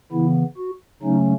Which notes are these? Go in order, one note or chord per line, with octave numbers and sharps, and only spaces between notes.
C#3 E3 B3 E4
F#4
C#3 F#3 A3 C#4 D#4